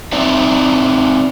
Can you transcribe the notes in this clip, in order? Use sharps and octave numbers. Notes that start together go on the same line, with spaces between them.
C4 D#4 D5 E5